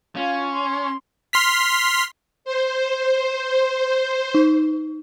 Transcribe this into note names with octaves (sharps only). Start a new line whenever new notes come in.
C#4 F4 F5
C6
C6 F6 B6
C5
D#4